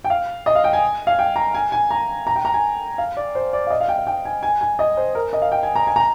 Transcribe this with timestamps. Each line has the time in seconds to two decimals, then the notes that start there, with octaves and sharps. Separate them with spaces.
0.04 G5
0.10 F5
0.46 D#5
0.55 F5
0.64 G5
0.73 G#5
1.07 F5
1.19 G5
1.36 A#5
1.54 G#5
1.72 G#5
1.91 A#5
2.27 A#5
2.36 G5
2.45 A#5
2.54 G#5
2.98 F5
3.17 D5
3.35 C5
3.53 D5
3.67 F5
3.70 D#5
3.80 F5
3.89 G5
3.98 F5
4.07 G5
4.25 G#5
4.43 G#5
4.61 G#5
4.79 D#5
4.97 C5
5.15 A#4
5.33 D#5
5.42 F5
5.52 G5
5.63 G#5
5.76 A#5
5.87 G#5
5.96 A#5